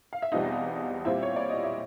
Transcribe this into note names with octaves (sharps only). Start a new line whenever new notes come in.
F5
E5
E2 B2 G3 C4 D#4 F4 D#5
A#2 G3 C4 E4 F4 E5
C#5
D5
D#5
E5